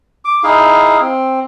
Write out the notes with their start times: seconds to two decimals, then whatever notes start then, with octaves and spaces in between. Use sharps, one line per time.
0.25 D6
0.44 D#4 E4 G#4 F5
1.00 C4